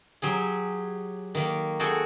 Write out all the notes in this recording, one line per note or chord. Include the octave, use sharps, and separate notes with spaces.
F#3 G4 G#4
D#3 A#3
F#4 G#4 A4 G5